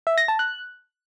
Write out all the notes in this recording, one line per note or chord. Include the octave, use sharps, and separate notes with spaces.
E5
A#6
A5
F#6